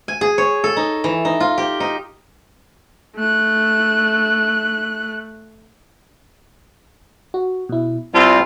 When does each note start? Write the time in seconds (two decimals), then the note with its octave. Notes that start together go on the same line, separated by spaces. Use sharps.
0.08 G#5
0.21 G#4
0.38 C#5
0.64 A4
0.77 D#4
1.04 E3
1.25 D#4
1.40 F4
1.58 G4
1.80 D#4
3.16 A3 F#6
7.34 F#4
7.69 B2 E4
8.14 C2 G3 C4 F4 A5